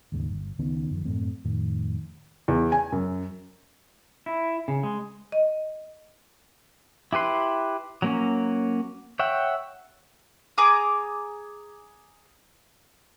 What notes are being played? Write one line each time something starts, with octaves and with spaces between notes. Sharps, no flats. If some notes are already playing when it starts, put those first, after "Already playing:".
D#2 G#2 C#3
G1
C#2 D#3 B3 C#4
F#2 D#3 F3
F#2 A2 A3 C4
F2 A2 D#3
E2
G#5
F#2
E4
C#3
G#3
D#5
E4 G4 B4 C6
F#3 A#3 C#4
C#5 E5 F#5 G5
G#4 A#5 D6 D#6